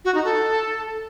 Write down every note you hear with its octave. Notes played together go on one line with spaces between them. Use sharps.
F#4
D#4
A4